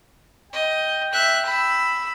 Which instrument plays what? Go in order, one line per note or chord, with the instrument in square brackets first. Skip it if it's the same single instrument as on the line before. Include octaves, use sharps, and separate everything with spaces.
[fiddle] D#5 [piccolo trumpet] G5
[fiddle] E5 F#6
B5 E6